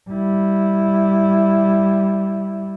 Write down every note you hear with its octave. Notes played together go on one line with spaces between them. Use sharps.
G3 E4